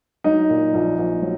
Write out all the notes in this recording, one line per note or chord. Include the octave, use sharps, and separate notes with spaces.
F#3 D#4
A#2
A#1
A#1
F#3